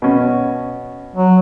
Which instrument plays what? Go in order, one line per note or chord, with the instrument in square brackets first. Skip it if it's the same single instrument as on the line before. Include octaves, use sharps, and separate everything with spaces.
[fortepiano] B2 C#4
[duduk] F#3